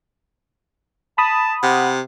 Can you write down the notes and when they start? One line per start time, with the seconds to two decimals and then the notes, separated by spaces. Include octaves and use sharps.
1.18 A5 B5 D#6
1.63 C3 F#5